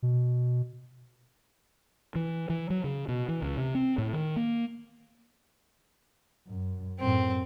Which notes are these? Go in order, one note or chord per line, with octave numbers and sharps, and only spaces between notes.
B2
E3
E3
F#3
C#3
B2
E3
C#2
C3
C4
A2
D#3
A#3
F#2
F#2 A2 C4